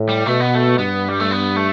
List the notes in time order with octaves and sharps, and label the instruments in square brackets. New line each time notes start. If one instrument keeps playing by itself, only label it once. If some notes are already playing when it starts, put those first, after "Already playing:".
Already playing: [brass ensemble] A2
[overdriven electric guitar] G3
[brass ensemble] B2 [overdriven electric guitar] A3
[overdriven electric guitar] B3
A3
[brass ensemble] G2 [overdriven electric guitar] B3
[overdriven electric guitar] G3
A3
B3
A3